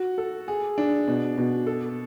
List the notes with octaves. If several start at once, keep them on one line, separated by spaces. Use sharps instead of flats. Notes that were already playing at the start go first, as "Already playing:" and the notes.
Already playing: F#4
A4
G#4
D4
B2
B2
A4